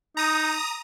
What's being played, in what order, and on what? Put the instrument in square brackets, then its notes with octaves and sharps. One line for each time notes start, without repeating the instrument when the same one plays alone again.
[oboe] D#4 [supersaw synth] A#5 D#6